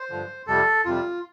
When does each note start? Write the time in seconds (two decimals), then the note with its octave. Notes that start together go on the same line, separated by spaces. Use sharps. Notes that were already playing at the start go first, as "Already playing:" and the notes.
Already playing: C5
0.10 G2 D3 F3
0.47 F2 C3 G3 A4
0.85 F2 C3 G3 F4